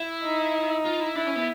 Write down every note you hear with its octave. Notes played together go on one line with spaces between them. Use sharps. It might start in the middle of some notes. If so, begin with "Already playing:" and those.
Already playing: E4
D#4
F4
E4
D4 E4
C#4
B3